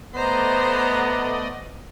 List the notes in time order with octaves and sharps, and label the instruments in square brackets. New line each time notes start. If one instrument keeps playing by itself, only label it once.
[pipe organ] A3 D5 D#5 [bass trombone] B3 [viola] C5 A#5